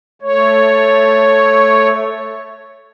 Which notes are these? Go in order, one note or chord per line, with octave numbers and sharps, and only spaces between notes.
A3 C#5